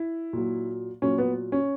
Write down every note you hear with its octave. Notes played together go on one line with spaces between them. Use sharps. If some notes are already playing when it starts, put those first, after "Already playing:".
Already playing: E4
A#2 F#3
A#2 F#3 C#4
B3
C#4